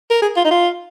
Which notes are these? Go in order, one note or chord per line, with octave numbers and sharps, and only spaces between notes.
A#4
G#4
F4
D#4
F4